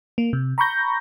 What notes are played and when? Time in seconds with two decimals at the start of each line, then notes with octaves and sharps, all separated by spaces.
0.18 A#3
0.33 C3
0.58 A#5 B5 C#6 G6 A#6